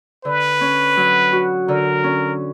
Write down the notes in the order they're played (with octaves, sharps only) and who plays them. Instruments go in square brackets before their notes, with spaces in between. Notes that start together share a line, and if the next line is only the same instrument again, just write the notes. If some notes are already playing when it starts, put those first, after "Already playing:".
[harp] D3 [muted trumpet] B4
[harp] C#4
F#3
F#4
[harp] D3 [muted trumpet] A#4
[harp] C#4